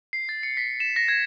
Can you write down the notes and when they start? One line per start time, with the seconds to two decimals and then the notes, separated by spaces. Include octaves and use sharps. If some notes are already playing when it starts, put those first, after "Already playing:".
0.13 C7
0.29 A6
0.43 C#7
0.57 B6
0.80 E7
0.96 A#6
1.08 G#6